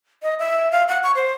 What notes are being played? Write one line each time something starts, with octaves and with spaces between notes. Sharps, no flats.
D#5
E5
F5
F#5
C#6
C5